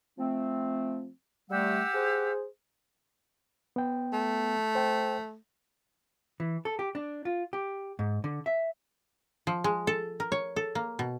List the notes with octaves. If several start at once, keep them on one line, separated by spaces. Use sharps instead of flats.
F3 A3 C4
G3 A3 G4 F#5 E6
G#4 C5
B3 G5
A3
C5 G5
E3
A4
G4
D4
F4
G4
G#2
D3
E5
F3
G#3
A4
A#4
C#5
A4
A#3
B2